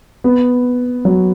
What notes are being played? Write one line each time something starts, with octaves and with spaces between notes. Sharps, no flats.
B3
F#3